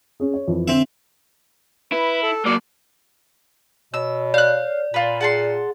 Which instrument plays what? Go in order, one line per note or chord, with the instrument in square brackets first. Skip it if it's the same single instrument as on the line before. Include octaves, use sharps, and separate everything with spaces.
[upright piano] C#4 G#4
C#5
F2 E3
[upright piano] D3 [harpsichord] C4 E5
[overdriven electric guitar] E4 [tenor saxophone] B4
[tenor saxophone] A4
[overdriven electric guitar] F#3 A#3 [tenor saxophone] D5
[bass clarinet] B2 [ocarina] C#5 [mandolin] E6
[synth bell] D5 [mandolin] F5 F#6
[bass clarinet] A#2 [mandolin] F4 B4
[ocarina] G#4 [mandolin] F#5 A5 C6